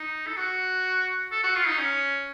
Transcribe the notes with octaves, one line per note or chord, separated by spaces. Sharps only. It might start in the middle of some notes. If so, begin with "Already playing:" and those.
Already playing: D#4
A4
F#4
A4
F#4
F4
D#4
C#4